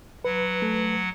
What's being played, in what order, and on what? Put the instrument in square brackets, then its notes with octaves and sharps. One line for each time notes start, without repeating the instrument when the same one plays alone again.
[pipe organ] F#3 F#5 [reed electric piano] B4
[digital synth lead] A3